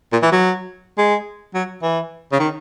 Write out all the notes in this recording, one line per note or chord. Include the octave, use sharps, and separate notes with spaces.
A#2
E3
F#3
G#3
F#3
E3
C#3
D#3